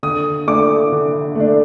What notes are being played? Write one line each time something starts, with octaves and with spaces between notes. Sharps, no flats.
D3 D#6
A3 D4 D6
D3
A3 D4